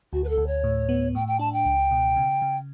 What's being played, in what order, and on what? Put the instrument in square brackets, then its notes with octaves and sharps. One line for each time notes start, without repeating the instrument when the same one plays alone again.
[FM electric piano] D2 [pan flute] F#4
[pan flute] B4
A4
[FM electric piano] D2
[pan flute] C#5
[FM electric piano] A2
B3
[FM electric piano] A2 [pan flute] G5
[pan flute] G5
[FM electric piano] D4 [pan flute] A5
[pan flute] G5
[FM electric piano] C#2
B2
C#3
C#3